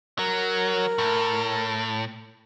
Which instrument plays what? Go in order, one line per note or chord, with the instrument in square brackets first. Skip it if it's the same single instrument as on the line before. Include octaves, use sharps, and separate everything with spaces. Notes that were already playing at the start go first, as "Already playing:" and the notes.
[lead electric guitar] F#3 [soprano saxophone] A#4
[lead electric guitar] A2